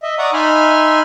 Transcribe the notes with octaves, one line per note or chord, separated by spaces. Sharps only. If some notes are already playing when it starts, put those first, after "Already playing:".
D#5 E5
D5 F#5 A#5 C#6 D#6
D#4 E5 G#5 B5 C6 F6